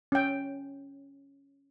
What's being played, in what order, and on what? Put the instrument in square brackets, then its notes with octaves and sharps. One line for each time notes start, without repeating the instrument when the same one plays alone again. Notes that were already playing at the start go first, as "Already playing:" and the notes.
[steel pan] C#4 G5